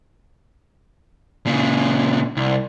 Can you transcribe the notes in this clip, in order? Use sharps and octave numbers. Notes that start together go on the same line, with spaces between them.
A#2 C#3
C2